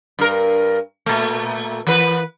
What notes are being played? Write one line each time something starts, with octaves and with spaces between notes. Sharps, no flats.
G2 A#4
A#2 A3
E3 B4